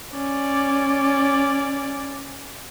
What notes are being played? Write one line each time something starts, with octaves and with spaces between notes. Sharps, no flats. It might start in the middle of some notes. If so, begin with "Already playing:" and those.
C#4 D5